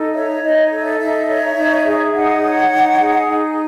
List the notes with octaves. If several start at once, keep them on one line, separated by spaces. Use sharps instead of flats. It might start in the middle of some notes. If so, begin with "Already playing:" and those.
Already playing: D#4 A4
C#5 E5
D#4 D#5
C#5
A4
E5
D#4 E5
C#5
D#4
G#4
D#4 F#5
C#5
D#4
G#4
D#4